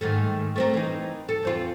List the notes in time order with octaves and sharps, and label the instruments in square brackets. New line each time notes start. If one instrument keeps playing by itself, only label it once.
[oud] G#2 D#3 A3
A3 C4 A#4
E3 C4 D#4
A4
E2 C4 F4